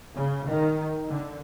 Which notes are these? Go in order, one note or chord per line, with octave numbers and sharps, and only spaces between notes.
C#3
D#3
D3